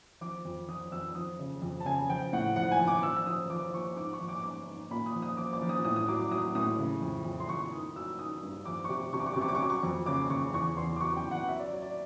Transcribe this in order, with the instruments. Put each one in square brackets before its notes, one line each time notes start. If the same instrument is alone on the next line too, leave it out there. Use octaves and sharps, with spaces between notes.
[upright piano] F3 D6
F2
F3 D#6
F2 E6
F3 D#6
C#3
F2
A5
C#3 G#5
F3 G5
A2 F#5
F3 F#5
G#5
F3
D6
F3 E6
E6
F3 D#6
F3 D6
F3 C#6
G#2 D6
C#6
F3
D6
G#2 D6
G#2
A#2 B5
D#6
F3
D#6
F3 D6
D6
F3
D#6
A2 D#6
D#6
F#3 D6
D6
F#3 D#6
A2 D#6
C#3
F2
F2
C6
F2 C#6
D#3 D#6
F#3 E6
D#3 D#6
G2
F3 D6
C#6
C3 D6
C3 C#6
D6
C#6
D6
C3
C#6
D6
C#6
F#3 D6
C#6
F2
C#3 D6
C#3 C#6
E2 C#6
E2 C6
D6
F#3 C#6
G5
E2
F#5
F#3 E5
D5
F#3 C#5
D5